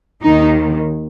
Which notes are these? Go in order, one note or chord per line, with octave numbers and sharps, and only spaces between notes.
D#2 D#3 D#4